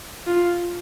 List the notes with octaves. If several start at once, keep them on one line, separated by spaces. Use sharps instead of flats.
F4